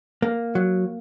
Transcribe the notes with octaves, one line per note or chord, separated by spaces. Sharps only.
A#3
F#3